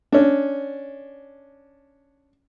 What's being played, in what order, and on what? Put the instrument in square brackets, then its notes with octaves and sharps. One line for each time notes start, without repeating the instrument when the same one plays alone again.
[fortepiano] C#4 D4